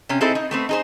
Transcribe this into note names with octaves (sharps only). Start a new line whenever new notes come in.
C3 C#4
C4 D#4 E4 G#4 A4
D#4
A3 B3 C4
D#4 G#4 C5